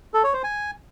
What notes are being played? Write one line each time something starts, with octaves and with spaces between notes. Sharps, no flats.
A4
C#5
C5
G#5